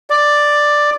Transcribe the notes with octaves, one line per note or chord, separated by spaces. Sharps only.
D5